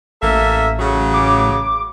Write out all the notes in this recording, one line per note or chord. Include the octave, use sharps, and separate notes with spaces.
A1 A#3 A4 E5
C#3 F#3
D6